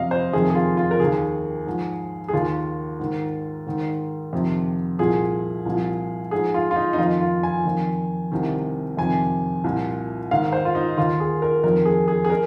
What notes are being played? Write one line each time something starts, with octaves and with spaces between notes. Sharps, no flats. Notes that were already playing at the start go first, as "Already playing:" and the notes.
Already playing: F2 C3 F3 D#5 F5
C5
F2 C3 D#3 G#4
G#4
F4
F4
A#4
D#2 D#3 G#4
G#2 F3
G#4
D#2 D#3 F4
G#2 D#3
G#2 D#3
F2 C3 D#3
C2 A#2 F3 G#4
C2 A#2 F3
G#2 F3 G#4
F4
F4
D#4
D#4
F2 D#3 F4
F4
G#5
F2 D#3
C2 C3 D#3
F2 C3 D#3 G#5
C2 A#2 F3
G#2 D#3 F5
C5
F4
D#4
D#2 D#3 F4
G#4
A#4
F2 D#3 A#4
G#4
G#4
G#4
A#4